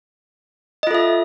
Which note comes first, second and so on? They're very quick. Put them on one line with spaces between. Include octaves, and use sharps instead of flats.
D#5 F4 A4 E5